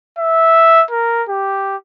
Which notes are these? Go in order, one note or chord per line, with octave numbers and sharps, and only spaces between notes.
E5
A#4
G4